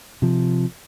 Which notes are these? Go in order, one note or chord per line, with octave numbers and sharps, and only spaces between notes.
C3 F3